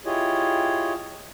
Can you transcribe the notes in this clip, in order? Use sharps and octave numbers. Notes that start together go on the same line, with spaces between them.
E4 F4 G4 G#4 C#5 D#5